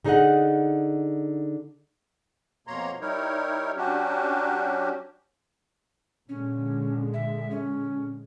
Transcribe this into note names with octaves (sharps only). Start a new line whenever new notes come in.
D3 D#4 G#4 B4 D#5 F#5
F2 B2 A#3 C#5 A#5 C6
G3 D#4 E4 A#4 C#5
F#3 C#4 D4 F#4 G4
A#2 D3 G#3 C#4
E5
C#4